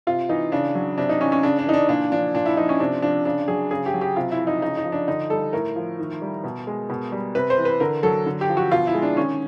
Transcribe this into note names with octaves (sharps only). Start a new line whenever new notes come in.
C3 F4
E3 D#4
C#3 D4
F#3
C3 D4
D#4
E3 C#4
C#4
C#3 D4
D4
E3 D#4
D4
A#2 D4
F3 D4
A#2 D4
E4
F3 D#4
C#4
C3 D4
F3 D4
C#3 D4
F#3 G#4
C#3 G#4
G4
F#3
G4
C3 F4
E4
F3
D#4
C#3 D#4
D#4
F3
D4
D3 D#4
G3 A4
A2 A#4
F3
D#3
G3
B2
G#3
B2
G3
C3 B4
C5
E3
B4
D3 A#4
F#3 A4
D3
G4
F3
F#4
B2 F4
E4
G#3
D4
D#3 C#4